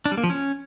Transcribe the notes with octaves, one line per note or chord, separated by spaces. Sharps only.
D4
G3
A#3
F3
C#4